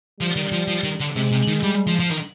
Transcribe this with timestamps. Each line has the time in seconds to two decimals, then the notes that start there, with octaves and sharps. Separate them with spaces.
0.20 F3 G3
0.36 D#3
0.52 F3
0.68 F3
0.83 D#3
1.00 D3
1.16 C3 G#3
1.31 C3
1.47 D#3
1.63 G3
1.87 F3
1.99 F3
2.11 D#3